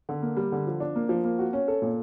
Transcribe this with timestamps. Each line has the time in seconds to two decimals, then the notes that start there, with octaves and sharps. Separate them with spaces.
0.09 D3
0.22 A#3
0.37 G3
0.52 D3
0.67 F3
0.80 D4
0.96 A#3
1.09 F3
1.24 A#3
1.39 F#4
1.53 C#4
1.68 A4
1.82 A#2